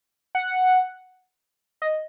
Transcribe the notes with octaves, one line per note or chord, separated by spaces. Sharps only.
F#5
D#5